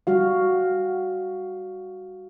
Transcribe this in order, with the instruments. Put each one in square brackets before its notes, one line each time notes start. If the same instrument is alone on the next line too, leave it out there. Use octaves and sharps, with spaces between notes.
[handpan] G3 F#4 F5